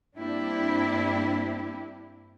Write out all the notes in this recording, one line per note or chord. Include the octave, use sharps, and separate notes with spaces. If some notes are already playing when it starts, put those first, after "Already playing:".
G2 A#3 C4 D4 E4 G4